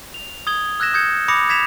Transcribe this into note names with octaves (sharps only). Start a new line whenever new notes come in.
F7
D#6 G#6 G7
E6 F#6 G#6 A#6 E7
D#6 G6 G#6 C#7
B5 D6 D#6 A#6 C#7 F7
G#6 B6 E7 F7